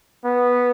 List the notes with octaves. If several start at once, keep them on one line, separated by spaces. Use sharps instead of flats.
B3